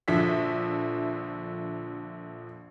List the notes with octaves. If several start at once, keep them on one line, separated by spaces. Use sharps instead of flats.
A#1 D3 F3 E5 B6